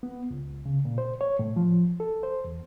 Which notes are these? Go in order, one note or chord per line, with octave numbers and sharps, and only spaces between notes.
B3
C#2
C#3
A#2
C5
C#5
A2
F3
A4
C5
E2